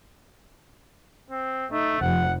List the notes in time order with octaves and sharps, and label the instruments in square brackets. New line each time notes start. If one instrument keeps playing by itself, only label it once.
[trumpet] C4
[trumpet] A3 [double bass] D#4
[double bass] F1 F3 [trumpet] F#5